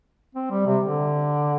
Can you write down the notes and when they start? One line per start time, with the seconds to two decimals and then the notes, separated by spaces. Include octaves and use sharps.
0.35 C4
0.51 G3
0.67 C3
0.84 D3